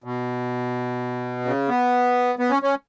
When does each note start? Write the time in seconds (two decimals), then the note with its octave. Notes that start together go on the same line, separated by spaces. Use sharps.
0.04 B2
1.45 C#3
1.69 B3
2.39 B3
2.51 C#4
2.62 C#4